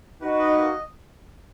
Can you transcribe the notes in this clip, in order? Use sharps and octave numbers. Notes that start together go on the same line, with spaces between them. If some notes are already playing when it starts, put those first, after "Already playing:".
D#4 F#4 B4
D#5
A#3